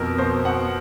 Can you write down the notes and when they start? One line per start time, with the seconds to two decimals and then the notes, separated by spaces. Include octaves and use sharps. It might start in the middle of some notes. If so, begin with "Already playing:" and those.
Already playing: F2 B2 A#4
0.18 B2 C5
0.45 B2 F#5